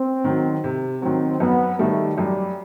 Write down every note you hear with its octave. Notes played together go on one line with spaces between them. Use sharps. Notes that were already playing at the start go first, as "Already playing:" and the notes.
Already playing: C4
D#3 F#3
C3
D#3 F#3 C4
F#2 B3
D#3 G3 A3
F#2 G3